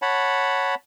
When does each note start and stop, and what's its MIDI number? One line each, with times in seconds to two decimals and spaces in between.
0.02 0.75 73
0.02 0.75 78
0.02 0.75 81
0.02 0.75 83